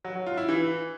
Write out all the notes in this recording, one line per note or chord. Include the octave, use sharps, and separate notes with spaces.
F#3
F#3
F4
E4
E3